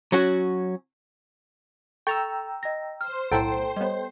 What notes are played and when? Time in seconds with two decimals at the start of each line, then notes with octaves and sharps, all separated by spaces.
0.12 F#3 C#4 F#4
2.07 A4 G5 A#5 C#6 E6 A6 F7
2.63 D#5 A#6
3.01 C5 C6 F6
3.32 B1 A2 E4 A4 F#5 G5 A#5 D7
3.76 G3 B3 C#5 D#5